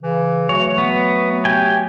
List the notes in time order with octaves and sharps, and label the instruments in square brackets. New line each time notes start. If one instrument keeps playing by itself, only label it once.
[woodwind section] C#3 E3
[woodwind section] F#3 A3 F#4 [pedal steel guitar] C#5
[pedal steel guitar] B3
G4 G5 G#5